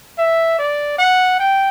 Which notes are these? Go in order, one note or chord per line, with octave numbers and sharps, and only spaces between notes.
E5
D5
F#5
G5